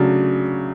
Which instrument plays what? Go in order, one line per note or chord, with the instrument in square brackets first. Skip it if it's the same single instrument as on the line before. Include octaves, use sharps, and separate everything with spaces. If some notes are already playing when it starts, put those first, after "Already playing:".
Already playing: [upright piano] C#3 F#3 A3 D4